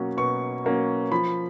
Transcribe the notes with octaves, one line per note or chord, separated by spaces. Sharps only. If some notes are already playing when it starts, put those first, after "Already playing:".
Already playing: B2 F#3 A#3 C#4
B2 C#6
F#3 A#3 C#4
F3 B5